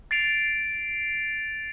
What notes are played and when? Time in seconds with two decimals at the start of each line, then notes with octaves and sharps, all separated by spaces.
0.11 A6 C7 D7 F7